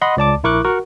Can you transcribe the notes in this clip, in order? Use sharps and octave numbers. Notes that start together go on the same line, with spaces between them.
D#5 F#5 B5 C6
C#2 D5 A5 D6
A#1 E4 A#4 C#6 D6 F#6
F#4 A#4 F#5 C#6